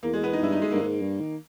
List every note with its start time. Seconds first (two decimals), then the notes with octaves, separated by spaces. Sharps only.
0.03 E2 A#3
0.13 G#3
0.23 B3
0.33 D#4
0.43 G2 E4
0.52 D#4
0.62 G#3
0.71 G2 A#3
0.82 G#2
1.02 G2
1.21 D#3